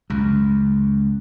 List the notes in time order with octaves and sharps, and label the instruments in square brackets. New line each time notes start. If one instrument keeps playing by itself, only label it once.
[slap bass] C#2 F#2